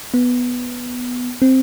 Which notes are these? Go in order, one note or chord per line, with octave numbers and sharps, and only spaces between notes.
B3
C4